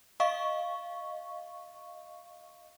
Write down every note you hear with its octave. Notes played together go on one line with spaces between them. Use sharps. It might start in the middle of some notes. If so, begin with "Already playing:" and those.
D#5 F5 C#6